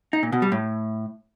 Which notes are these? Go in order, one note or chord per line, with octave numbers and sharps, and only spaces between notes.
D#4
A#2
B2
G3
A2